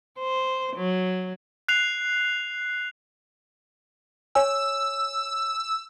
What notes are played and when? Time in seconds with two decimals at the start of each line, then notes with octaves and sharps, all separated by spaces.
0.19 C5
0.76 F#3
1.68 F#6 C7 F7
4.35 C#5 G#5 E6